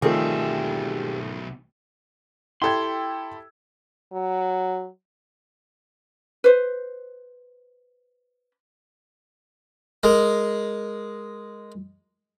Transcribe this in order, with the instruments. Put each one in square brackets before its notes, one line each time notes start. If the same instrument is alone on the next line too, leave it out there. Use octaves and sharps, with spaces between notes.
[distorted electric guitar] B1 E5 [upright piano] D#3 F3 A3 [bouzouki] G3 C4 G#4
[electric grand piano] E4 G4 A4 [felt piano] G5 E6 G#6 [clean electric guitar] C6
[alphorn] F#3
[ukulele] B4 C5
[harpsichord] G#3 A#4